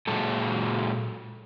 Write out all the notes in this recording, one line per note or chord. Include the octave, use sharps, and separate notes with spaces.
A#2 F#3 G#3 A4